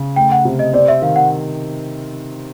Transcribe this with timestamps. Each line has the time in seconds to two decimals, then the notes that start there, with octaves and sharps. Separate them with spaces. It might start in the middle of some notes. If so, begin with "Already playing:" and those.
Already playing: C#3
0.16 A3 G5
0.32 F#5
0.45 C3
0.59 D#5
0.73 C4 D5
0.88 E5
1.02 D#3 F5
1.16 F#5